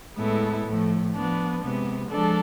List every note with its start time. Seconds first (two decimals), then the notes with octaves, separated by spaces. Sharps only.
0.16 A2 G#3 B3 E4 A4
0.65 A2 F3 A3
1.14 F3 B3 D4
1.62 C3 G#3 B3
2.11 F3 G#3 D4 A4